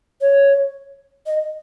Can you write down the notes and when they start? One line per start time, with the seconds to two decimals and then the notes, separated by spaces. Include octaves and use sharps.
0.21 C#5
1.26 D#5